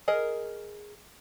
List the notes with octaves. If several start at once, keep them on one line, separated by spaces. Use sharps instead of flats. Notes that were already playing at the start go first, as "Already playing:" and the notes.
G#4 A#4 D#5